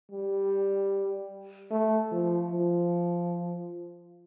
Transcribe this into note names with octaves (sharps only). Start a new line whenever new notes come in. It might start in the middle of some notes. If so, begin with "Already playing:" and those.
G3
A3
F3
F3